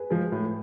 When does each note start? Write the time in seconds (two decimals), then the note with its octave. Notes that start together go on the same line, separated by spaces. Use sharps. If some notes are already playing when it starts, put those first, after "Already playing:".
Already playing: G#4 B4
0.10 F3 G#3
0.32 A2